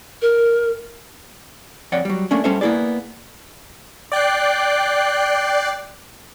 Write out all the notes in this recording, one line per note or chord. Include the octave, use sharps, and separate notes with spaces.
A#4
F2 C#5 D5 F#5
F#3 G3
A3 A#3 C#4 D4
G3 C#4 A4 C5 E5
A#3 B3 E4 G#4 D5
D5 G5 F#6 C7